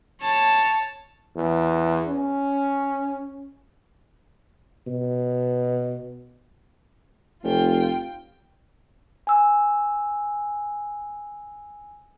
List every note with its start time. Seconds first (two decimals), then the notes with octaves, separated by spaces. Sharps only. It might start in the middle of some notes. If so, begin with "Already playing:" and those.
0.22 C#5 A5
1.36 E2
2.08 C#4
4.87 B2
7.43 F1 F4 G5
9.27 G#5 E6